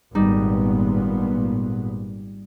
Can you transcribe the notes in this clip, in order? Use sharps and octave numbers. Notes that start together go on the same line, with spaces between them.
G#1 A#2 G3 B3 D#4